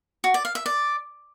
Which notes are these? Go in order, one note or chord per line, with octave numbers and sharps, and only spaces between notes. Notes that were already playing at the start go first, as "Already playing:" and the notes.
F#4
D5
F5
E5
D5